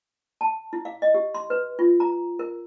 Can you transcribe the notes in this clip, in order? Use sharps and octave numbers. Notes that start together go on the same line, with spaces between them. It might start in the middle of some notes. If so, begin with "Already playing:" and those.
A5
E4
F5
D#5
G4
C6
B4
F4
A#5
A#4